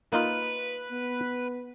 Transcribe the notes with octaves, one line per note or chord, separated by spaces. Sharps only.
A#3 D#4 F4 B4
B3